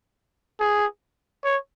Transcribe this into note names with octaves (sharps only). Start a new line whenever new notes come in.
G#4
C#5